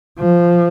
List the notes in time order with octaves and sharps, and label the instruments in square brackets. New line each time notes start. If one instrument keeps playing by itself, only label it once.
[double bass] F3